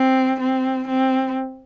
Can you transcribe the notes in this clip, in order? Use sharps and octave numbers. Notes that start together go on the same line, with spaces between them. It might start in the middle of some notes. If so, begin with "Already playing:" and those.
Already playing: C4
C4
C4